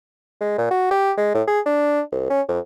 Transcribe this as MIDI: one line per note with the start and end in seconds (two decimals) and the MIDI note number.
0.41 0.57 56
0.58 0.68 46
0.71 0.89 66
0.91 1.12 67
1.17 1.30 56
1.34 1.42 45
1.47 1.60 68
1.66 2.01 62
2.12 2.29 36
2.30 2.41 61
2.48 2.59 41